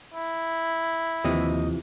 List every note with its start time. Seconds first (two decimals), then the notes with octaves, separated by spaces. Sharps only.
0.14 E4
1.24 D#2 C3 E3 F3 D#5 D#6